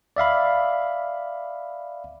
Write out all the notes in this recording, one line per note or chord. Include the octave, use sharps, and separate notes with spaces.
D5 E5 F5 B5